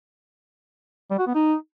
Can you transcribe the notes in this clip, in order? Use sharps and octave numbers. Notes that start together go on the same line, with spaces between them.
G3
F#4
B3
D#4